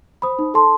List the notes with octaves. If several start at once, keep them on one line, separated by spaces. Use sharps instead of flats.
C5 B5 D#6
D#4
A4 A5 C6